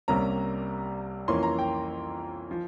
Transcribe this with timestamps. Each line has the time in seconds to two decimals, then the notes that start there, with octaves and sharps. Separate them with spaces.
0.08 C2 C3 G3 A#3 C#4 A#5
1.28 F2 E3 A#3 C#4 C6
1.43 A#5
1.59 G5
2.51 F3